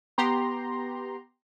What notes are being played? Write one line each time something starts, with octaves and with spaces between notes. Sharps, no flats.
B3 G4 A#5 C6